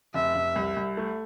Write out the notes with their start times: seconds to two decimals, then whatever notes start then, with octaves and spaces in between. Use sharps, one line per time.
0.14 F1 E5
0.35 F1
0.56 C2
0.76 C2
0.97 A3